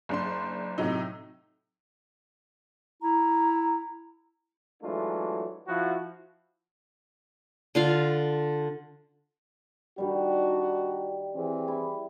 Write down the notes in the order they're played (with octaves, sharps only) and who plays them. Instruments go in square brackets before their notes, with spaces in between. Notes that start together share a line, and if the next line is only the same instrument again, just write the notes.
[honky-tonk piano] F#1 D4 C6
A2 C3 F#3 D#4
[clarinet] E4 [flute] A#5
[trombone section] E3 F#3 G#3 A3 D4 F4
F3 E4 F#4
[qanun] D3 F4 F5
[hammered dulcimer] D#3 G3 [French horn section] D4 D#4 F#4
[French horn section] E3 C4 G#4
[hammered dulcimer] E4